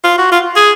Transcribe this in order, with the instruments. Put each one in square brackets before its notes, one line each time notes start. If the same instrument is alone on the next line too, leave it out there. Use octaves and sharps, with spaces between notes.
[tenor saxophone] F4
F#4
F4
G#4